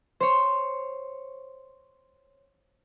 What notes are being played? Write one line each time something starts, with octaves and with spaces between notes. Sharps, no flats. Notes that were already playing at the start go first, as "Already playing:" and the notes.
C5 C#5